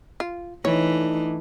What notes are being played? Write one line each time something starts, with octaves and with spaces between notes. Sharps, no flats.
F4
E3 A3 D4 D#4 C#5